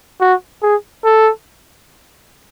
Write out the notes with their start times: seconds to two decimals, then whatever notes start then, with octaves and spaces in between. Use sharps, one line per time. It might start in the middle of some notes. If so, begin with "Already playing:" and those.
0.21 F#4
0.63 G#4
1.05 A4